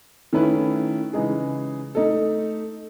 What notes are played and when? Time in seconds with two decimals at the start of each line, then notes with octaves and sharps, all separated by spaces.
0.33 D#3 A3 C#4 E4 B4
1.13 C#3 E3 G#3 D#4 G#4
1.95 A3 D#4 A4